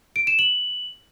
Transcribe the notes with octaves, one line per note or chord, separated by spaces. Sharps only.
D7
E7
F#7